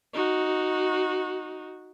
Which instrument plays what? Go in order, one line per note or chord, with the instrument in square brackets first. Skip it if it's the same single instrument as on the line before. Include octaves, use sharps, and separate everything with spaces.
[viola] D#4 F#4